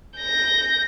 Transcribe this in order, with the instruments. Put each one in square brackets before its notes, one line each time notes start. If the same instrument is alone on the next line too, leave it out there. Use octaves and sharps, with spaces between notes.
[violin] G6 A#6